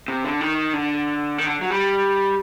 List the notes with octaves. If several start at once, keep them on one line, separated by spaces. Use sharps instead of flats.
C3
D3
D#3
D3
D#3
D3
F#3
G3